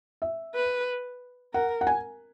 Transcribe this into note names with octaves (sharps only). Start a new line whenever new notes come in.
E5
B4
A#4 F#5
F#5
G#5